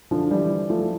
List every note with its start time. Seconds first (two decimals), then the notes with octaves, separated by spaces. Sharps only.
0.11 D3 F3
0.31 E3 G3
0.70 F3 A3